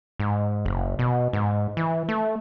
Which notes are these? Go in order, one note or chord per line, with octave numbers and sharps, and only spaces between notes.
G#2
F#1
B2
G#2
E3
A3